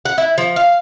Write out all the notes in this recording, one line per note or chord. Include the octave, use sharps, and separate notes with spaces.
F#5
E4
F3
F5